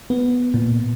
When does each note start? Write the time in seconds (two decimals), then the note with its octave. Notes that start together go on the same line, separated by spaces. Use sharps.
0.10 B3
0.54 A#2